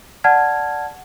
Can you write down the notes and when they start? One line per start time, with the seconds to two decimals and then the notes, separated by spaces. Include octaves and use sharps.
0.24 D5 F#5 A5 F6 G#6